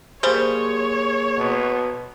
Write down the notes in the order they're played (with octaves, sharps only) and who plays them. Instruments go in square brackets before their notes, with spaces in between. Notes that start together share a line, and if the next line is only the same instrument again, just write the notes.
[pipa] G3 C5 [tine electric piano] A#3 G#4 [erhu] C#5
[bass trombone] B2